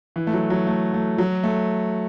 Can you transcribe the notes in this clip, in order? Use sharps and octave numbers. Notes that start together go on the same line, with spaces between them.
E3
A3
F#3
F#3
A3
A3
F#3
A3